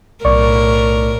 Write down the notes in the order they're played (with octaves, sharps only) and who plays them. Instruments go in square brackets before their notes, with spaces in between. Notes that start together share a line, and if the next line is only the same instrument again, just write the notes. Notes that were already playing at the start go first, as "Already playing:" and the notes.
[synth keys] B1 D5 C#6 [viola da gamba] A2 A#4